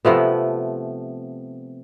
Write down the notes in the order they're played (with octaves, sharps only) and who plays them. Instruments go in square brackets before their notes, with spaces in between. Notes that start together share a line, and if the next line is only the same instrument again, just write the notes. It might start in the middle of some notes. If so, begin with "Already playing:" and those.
[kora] C3 F3 A3 B3